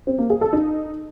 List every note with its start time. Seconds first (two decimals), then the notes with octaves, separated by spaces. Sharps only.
0.07 C4
0.18 A#3
0.30 G#4
0.41 A4
0.53 D#4